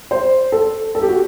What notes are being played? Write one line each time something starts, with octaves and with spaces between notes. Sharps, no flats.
C5
A4
A4
G4
F#4